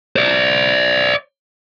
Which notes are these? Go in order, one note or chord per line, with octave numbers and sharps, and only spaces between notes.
C5 D5